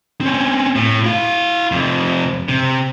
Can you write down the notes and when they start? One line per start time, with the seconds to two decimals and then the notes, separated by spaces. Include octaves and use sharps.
0.21 C4 C#4
0.76 A2
1.04 E4 F5
1.72 F2 C3
2.49 C3